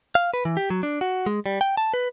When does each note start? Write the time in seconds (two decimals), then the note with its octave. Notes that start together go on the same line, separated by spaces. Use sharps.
0.15 F5
0.34 B4
0.45 E3
0.57 G4
0.70 F#3
0.83 D4
1.01 F#4
1.26 G#3
1.46 G3
1.61 G5
1.77 A5
1.94 B4